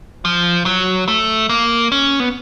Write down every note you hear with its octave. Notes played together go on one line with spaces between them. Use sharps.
F3
F#3
A3
A#3
C#4
B3